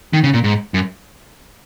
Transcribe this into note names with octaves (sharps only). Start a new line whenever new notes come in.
D#3
C#3
A#2
G#2
F#2